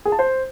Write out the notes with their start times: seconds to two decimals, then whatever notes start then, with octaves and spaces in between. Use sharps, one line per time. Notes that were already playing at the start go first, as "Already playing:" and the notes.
0.05 G#4
0.12 A5
0.19 C5